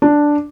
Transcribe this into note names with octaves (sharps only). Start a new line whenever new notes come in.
D4